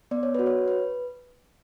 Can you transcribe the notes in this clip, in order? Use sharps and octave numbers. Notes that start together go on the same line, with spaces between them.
B3 D5
C#5
F#4 B4
C#5
B4